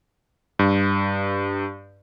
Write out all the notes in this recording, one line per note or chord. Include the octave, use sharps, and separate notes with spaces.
G2